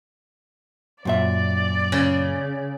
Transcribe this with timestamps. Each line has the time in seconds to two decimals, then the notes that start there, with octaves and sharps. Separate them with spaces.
1.05 F#2 A#2 D5 E5
1.92 C#3